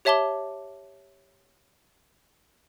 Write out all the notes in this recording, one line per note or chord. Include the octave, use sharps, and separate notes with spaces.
G4 C#5 E5 A5 D6 G7